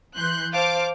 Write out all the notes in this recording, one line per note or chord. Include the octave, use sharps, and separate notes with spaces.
E3 C6 F#6 G6
C5 F5 A5 D6 F6